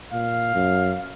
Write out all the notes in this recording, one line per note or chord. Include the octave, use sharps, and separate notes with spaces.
A#2 F5
F#2